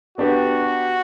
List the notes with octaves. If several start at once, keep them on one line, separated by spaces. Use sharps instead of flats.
B3 D4 F#4 G4 B4